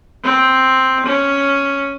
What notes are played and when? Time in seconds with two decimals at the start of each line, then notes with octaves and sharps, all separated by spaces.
0.24 C4
1.05 C#4